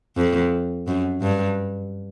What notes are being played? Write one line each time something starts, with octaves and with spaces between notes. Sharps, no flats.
F2
F#2
G2